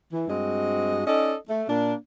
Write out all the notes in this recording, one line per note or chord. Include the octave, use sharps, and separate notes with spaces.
E3
G2 G#3 C4 F#4 D#5
C#4 D#4 A4 D5 D#5
A3
A#2 A#3 D4